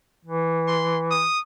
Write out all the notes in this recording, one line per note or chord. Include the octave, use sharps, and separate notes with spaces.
E3
C6
D#6